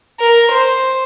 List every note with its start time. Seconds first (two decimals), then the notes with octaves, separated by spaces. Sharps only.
0.20 A#4
0.51 C5